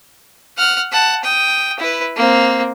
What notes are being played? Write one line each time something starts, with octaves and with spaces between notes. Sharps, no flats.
F#5 F6
F#5 A5
G5 D#6
E4 B4
A#3 C4